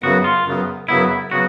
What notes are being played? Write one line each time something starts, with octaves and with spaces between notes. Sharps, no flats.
F#2 C#3 F#3 B3 F#4
F4
F#2 C#3 F#3 B3
F#2 C#3 F#3 B3 E4
C#3 F#3 B3 F#4